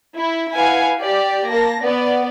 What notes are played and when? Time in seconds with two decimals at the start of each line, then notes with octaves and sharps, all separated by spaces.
0.17 E4
0.54 E4 B4 F5 F#5 G#5
1.01 G4 D5
1.49 A#3 A5 A#6
1.82 B3 D5